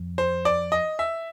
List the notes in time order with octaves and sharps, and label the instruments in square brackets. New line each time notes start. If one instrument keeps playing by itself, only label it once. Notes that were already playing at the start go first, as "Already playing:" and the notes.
Already playing: [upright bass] F2
[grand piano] C5
D5
D#5
E5